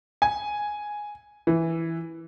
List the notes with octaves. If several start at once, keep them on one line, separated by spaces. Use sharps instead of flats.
G#5
E3